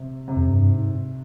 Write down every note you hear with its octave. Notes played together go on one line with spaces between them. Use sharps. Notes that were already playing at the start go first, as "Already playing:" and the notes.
Already playing: C3
C3
F2
G2
G#2